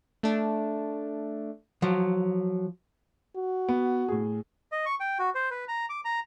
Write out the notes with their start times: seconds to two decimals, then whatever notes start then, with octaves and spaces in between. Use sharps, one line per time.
0.23 A3 D4
1.82 F3 F#3
3.36 F#4
3.69 B3
4.08 A2 G#4
4.72 D#5
4.86 C#6
5.00 G5
5.19 F#4
5.35 C5
5.51 B4
5.68 A#5
5.89 D6
6.05 A#5